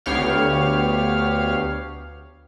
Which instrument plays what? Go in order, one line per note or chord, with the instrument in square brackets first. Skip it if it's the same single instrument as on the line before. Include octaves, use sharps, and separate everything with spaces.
[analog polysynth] D2 B3 G4 C#5 F5 F6